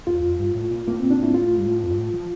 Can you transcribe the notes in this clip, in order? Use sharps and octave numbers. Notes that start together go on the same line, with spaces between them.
E2 F4
F2
G2
A2
A#2
A2 A#3
A#2 C4
D4
A2 E4
G2
A2 F4
G2
A2
F2
G2
A2
F3